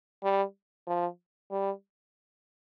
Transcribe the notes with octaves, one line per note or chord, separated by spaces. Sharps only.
G3
F3
G3